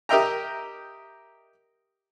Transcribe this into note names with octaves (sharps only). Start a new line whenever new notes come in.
G4 A#4 D#5 E5 G5 A#5